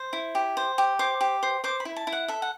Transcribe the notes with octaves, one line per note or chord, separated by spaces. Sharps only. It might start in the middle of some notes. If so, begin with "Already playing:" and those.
Already playing: C5
E4
G4
C5
G4
C5 D6
G4
C5
C5 D6
B5
E4
A5
E4
F#5
A4 E5
F#5